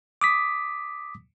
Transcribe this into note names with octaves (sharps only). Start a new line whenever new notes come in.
D6 D#6 B6